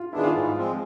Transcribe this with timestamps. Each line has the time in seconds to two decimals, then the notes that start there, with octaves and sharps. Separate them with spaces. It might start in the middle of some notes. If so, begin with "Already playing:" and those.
Already playing: F4
0.13 D#3 G#3 B3 D4 E4
0.24 F4
0.35 G#2
0.55 F3 G#3 C4